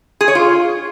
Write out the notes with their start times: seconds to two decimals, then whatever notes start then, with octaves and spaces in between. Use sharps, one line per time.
0.21 G#4
0.28 C#5
0.35 F4